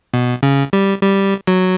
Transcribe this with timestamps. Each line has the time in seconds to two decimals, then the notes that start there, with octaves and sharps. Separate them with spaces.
0.14 B2
0.43 C#3
0.73 G3
1.02 G3
1.47 F#3